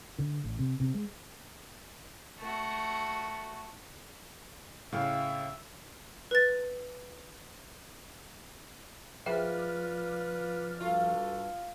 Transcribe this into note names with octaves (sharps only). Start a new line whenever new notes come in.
D3
A1
C3
C3
G#3
A3 F#4
A2 C#3 E5 F5 G5
B4 A6
F3 F4 G#4 B4 D5 E5 G5 F6
G2 F4 F#4 A4